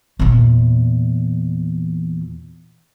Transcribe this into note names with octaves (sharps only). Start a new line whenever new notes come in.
E2 A#2